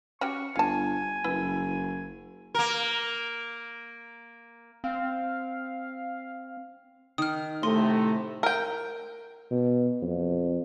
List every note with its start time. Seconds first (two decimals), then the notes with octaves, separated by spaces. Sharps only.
0.21 C#4 F#4 G4 C#6
0.56 G1 F5 G#5 A5
1.24 F#1 E4 G#4 B4
2.54 A#3 A#4
4.84 C4 F5
7.18 D#3 D#6 F6
7.63 A2 C3 A3 D#5 C6
8.43 A#4 G5
9.51 B2
10.02 F2